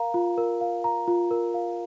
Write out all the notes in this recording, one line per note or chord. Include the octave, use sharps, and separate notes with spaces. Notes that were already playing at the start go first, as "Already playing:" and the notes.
Already playing: A#4 F5 A#5
F4
A#4
F5
A#5
F4
A#4
F5